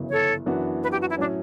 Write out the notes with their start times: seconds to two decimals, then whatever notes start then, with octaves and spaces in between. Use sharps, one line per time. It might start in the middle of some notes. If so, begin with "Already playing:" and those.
Already playing: G1 F#2 C#3 E3
0.10 A4 C#5
0.46 F#2 E3 B3 D4 F#4
0.82 B4
0.91 G4
1.00 F#4
1.09 E4
1.18 A2 F#3 C#4 D4